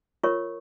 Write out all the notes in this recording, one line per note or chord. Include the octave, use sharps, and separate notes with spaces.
F4 A#4 C#5 C#6